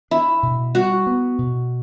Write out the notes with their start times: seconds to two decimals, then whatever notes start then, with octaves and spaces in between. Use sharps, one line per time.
0.11 D4 E4
0.43 B2
0.75 G3 F#4
1.07 B3
1.38 B2